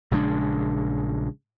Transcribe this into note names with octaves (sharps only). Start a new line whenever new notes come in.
A#1 C#3 G#3 D4